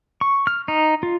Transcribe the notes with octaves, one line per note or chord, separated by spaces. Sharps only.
C#6
F6
D#4
F4